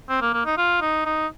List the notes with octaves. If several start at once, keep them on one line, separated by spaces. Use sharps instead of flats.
C4
A#3
A#3
D#4
F4
D#4
D#4